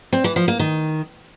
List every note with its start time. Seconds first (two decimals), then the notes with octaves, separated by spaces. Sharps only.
0.13 C4
0.24 E3
0.36 F3
0.48 A#3
0.59 D#3